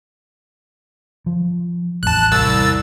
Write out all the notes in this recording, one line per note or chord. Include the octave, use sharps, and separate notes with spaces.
F3
A1 E2 A5 F#6
C2 E6 A6